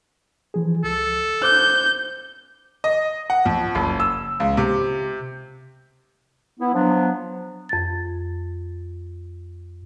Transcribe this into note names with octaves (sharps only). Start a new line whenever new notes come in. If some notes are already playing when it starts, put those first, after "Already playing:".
E3 F3 G#4
C#2 A4
C5 D6 F#6 G6
D#5
F#5
F2
F#1
E6
C#2
C3
B3 E4
F3 F#3 B3 D4
F2 A6